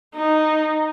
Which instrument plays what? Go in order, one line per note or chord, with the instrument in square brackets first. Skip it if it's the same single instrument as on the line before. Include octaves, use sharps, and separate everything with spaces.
[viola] D#4